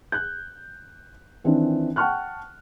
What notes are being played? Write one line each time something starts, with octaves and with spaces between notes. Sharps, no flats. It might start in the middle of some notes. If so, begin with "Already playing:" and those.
F#6 G6
D#3 E3 C4 D4
F#5 G5 A5 C#6 F6 F#6